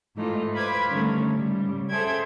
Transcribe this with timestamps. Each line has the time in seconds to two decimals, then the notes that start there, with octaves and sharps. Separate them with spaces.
0.15 G#2 E3 A3 D#4 F4
0.53 B4 C5 F5 B5 D6 G#6
0.88 D3 D#3 G3 A3 C#4
1.30 G#2 C#3 G3
1.90 G#4 A4 C5 E5 G5 G#6